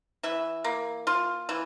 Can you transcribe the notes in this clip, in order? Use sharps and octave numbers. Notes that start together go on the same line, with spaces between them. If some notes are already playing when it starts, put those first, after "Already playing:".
E3 E5
A#3
F4
E3